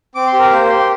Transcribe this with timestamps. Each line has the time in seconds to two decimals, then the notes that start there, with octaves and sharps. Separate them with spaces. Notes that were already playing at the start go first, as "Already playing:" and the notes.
0.15 C4 D6
0.27 C6
0.33 G4
0.39 A#4
0.51 A#3 C5
0.69 G4 C6